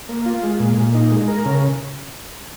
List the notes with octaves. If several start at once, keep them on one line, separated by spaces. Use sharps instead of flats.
A#3
F4
G#3
A#2
A#2
D#4
G#3
A#4
C#3